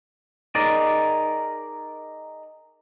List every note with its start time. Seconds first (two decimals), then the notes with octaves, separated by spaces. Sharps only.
0.55 D#4 G#4 A#4 D5